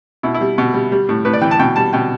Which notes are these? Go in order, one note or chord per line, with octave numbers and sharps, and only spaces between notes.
B2 E4
E4
G3
B2
G3
G3
A2
A2 B4
D5
E3 G5
A5
B2 G5
G3 A5
B2 G5